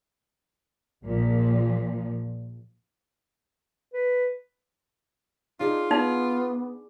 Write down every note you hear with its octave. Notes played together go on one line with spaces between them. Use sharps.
A#1 A#2 F3
B4
D4 D#4 F4 G#4
B3 D#4